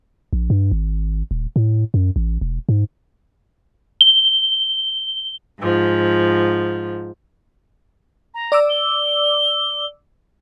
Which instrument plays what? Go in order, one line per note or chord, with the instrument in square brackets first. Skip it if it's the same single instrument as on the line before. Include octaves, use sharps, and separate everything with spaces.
[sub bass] A#1
G2
G#1
D#1
A2
F#2
A1
E1
G#2
[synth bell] G7
[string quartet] G#2 F3
[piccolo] A#5
[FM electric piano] D5 D6 E6
[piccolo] G7